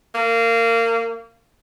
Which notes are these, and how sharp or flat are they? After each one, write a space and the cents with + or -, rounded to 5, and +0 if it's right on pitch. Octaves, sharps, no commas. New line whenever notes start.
A#3 -25